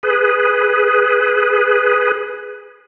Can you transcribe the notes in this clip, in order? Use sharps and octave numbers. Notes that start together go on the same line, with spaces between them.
G#4 B4